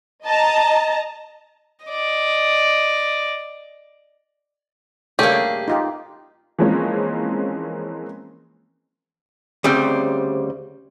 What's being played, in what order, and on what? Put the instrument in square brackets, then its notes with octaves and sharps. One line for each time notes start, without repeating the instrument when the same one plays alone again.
[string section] D#5 A5 A#5
[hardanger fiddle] D5 D#5
[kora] G2 C#3 A3 [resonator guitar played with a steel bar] A#3 G#4 [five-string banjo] G4 [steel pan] C#5
[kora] D5
[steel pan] D#4 F4 G4
[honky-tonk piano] E3 F3 G#3 A#3 C4 C#4
[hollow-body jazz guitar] D2 C#3 G3 C4